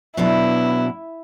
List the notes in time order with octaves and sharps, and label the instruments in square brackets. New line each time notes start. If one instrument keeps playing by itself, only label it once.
[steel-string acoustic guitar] B2 F#3 B3 D4 [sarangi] E4